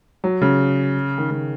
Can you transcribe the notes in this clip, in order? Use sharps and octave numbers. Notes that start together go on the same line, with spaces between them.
F#3
C#3
D#3
C#3